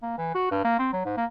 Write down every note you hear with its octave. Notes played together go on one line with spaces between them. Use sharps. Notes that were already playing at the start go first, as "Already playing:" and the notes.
A#3
E3
F#4
G2
A#3
C4
F#3
G#2
A#3